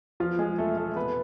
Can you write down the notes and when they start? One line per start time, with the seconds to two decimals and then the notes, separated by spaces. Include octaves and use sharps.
0.20 E2 F3 F4
0.39 G#3 G#4
0.58 E1 A3 A4
0.77 A3 A4
0.92 A4
0.96 C3 B3 B4